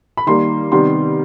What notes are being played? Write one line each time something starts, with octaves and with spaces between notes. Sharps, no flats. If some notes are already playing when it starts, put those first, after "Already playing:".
B5
D#3 G3 A#3 C6
C3 D#3 G3 B3 C6